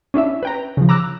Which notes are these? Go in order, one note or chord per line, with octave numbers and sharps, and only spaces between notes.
C#4 D4 E4 E5
B4 G5 A#5
C#3 F3
A#5 D6 E6 F#6